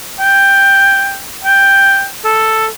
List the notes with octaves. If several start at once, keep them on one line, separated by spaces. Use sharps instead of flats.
G5
G5
A4